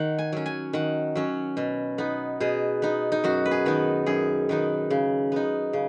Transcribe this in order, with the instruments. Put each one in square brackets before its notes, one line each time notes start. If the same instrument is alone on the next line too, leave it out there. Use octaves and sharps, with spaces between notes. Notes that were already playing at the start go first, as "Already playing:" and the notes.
Already playing: [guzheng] D#3 F#5
G#5
F#3 C#4
G#5
D#3 F#5
F#3 C#4
B2
B3 D#4
B2 G#4
B3 D#4
D#4
F#2 F#4
B4
G#4
D#3 B3 D#4
F#2 G#4
D#3 B3 D#4
C#3
B3 D#4
C#3